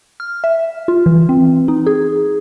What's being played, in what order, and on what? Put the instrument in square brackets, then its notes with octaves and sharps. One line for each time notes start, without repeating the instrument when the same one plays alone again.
[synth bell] F6
E5
F4
E3
C4
D#4
G#4